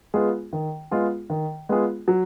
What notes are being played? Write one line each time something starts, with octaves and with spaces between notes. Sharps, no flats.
G#3 B3 F4 G#4
D#3
G#3 B3 F4 G#4
D#3
G#3 B3 F4 G#4
F#3